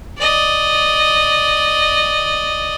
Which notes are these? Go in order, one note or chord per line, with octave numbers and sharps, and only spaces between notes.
D5 D#5